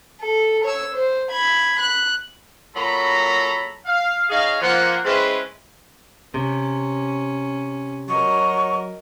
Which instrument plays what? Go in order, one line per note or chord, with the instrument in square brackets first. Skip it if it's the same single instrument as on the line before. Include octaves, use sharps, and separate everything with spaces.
[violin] A4
C#5 E6
C5
B5 G#6
F#6
[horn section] A#2 F#3 A4 A#5 B5
F5
D#4 G#4 C#5 F5
F3 A#3 F#5
G#3 C4 C#4 E4 B4
[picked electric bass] C3 [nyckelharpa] C#4
[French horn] F#3 [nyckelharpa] A#4 D#5 [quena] C#6